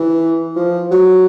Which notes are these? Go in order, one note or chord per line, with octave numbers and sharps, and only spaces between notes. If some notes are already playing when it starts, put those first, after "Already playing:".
Already playing: E3
F3
F#3